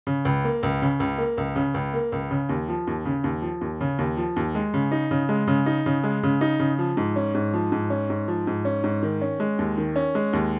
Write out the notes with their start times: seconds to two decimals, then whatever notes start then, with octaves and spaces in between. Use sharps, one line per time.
0.07 C#3
0.25 C#2
0.45 A#3
0.63 C#2
0.82 C#3
1.00 C#2
1.18 A#3
1.38 C#2
1.56 C#3
1.74 C#2
1.94 A#3
2.12 C#2
2.31 C#3
2.49 D#2
2.68 F3
2.87 D#2
3.05 C#3
3.24 D#2
3.42 F3
3.61 D#2
3.81 C#3
3.99 D#2
4.17 F3
4.36 D#2
4.55 G#3
4.74 C#3
4.92 D#4
5.11 C#3
5.29 G#3
5.47 C#3
5.66 D#4
5.86 C#3
6.04 G#3
6.23 C#3
6.41 D#4
6.59 C#3
6.78 F3
6.97 G#2
7.16 C#4
7.35 G#2
7.54 F3
7.72 G#2
7.90 C#4
8.10 G#2
8.28 F3
8.47 G#2
8.65 C#4
8.84 G#2
9.03 D#3
9.21 C#4
9.40 G#3
9.59 D#2
9.78 D#3
9.96 C#4
10.15 G#3
10.33 D#2